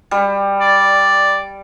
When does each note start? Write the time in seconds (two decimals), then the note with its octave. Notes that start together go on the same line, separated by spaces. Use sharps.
0.11 G3
0.60 D5